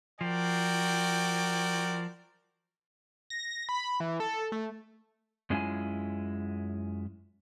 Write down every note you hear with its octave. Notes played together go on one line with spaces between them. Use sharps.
F3 F#4 A#4 D5 G5
A#6
B5
E3
A4
A3
F#2 G#3 C#4 E4 F4 G#5